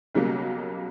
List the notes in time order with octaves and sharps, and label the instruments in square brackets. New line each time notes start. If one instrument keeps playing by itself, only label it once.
[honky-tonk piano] B1 C#3 F#3 G3 A#3